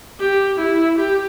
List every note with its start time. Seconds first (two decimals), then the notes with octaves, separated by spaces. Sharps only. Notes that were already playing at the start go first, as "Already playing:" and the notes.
0.20 G4
0.59 E4
0.98 G4